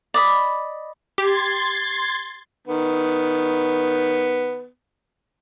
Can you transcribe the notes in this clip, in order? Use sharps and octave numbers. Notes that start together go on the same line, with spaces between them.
D5 D#5 B5
G4 C6 G#6 A6
D#3 B3